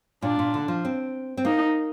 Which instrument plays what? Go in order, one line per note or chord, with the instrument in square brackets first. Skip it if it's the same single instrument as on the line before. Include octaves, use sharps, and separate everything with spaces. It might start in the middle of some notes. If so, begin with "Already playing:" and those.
[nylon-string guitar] A#2 [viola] D4
[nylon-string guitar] A#2
D3
F3
C4
C4
[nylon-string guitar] A#3 [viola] D#4